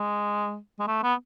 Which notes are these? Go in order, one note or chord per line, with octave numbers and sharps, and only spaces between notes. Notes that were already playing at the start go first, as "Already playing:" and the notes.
Already playing: G#3
G#3
A3
B3